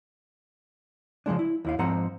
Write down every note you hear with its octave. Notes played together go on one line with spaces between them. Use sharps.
C#3 F3 G#3 D4
E4
D#2 E4 F5
G#2 F3 C4 C5 F#5 A#5